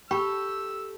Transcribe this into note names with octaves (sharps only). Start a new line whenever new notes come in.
G4 A4 G5 B5 C#6 E6